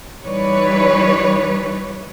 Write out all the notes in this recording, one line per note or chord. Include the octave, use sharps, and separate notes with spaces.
E3 G3 D#4 B4 C#5 D5